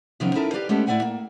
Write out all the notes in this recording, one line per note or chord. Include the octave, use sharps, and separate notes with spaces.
C3 D#3 F3 F#3 B3 C#4
C#4 D#4 E4 A4 A#4
G4 B4 D5 F5
G#3 A3 B3 C#4 G4 A4
A2 E4 D5 E5 F#5 G#5
A#3